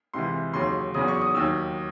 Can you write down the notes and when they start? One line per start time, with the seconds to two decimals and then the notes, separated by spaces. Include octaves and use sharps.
0.14 C#2 C3 E3 C6
0.54 D#2 C#3 F#3 C6
0.94 E2 C#3 F#3 D#6
1.08 C#6
1.22 D#6
1.35 D#2 D#3 F#3 E6